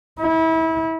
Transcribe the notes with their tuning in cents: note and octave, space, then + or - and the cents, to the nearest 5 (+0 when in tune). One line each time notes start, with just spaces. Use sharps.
E4 -30